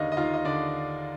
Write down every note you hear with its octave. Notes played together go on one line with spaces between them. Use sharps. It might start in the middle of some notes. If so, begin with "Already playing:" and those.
Already playing: D#2 D3 D4 D#4 D#5 F5
D#5
D#2 F4 F5
D#5
D3 D4 D5